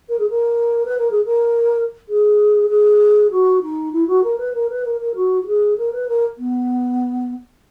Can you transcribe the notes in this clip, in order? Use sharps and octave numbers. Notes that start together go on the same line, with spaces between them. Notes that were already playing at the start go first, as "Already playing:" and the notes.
A#4
G#4
A#4
B4
A#4
G#4
A#4
G#4
G#4
F#4
D#4
E4
F#4
A#4
B4
A#4
B4
A#4
A#4
F#4
F#4
G#4
A#4
B4
A#4
B3